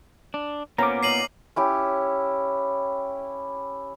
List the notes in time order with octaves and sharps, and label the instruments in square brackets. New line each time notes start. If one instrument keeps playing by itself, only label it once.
[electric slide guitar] D4
[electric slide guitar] A#2 B3 [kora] A#3 C#4 C5 [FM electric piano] A#5 D6
[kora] C#4 D#4 [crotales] C7 D#7 F#7
[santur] C#4 E4 G4